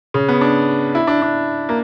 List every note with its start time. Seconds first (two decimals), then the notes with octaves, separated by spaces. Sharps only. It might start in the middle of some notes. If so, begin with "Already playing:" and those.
0.14 C#3
0.29 B3
0.41 D4
0.95 E4
1.07 D4
1.22 D4
1.69 A#3